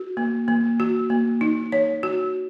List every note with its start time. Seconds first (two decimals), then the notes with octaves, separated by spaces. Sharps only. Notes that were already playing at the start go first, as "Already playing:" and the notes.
Already playing: F#4
0.17 A#3
0.48 A#3
0.80 F#4
1.10 A#3
1.41 D#4
1.72 C#5
2.03 F#4